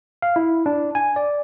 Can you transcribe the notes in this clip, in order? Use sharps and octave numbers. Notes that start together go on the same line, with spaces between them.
F5
E4
D4
G#5
D5